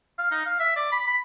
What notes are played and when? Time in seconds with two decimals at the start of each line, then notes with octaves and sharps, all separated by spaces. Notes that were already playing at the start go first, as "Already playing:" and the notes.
0.18 F5
0.31 D#4
0.45 F5
0.60 E5
0.76 D5
0.92 B5
1.07 B5